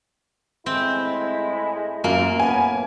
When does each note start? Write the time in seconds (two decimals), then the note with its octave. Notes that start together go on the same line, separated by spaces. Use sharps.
0.66 A2 G#3 C4 E4
2.04 F#2 A#3
2.40 A2 B3 G#5